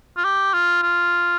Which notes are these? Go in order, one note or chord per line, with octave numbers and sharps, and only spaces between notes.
F4
G4
F4
F4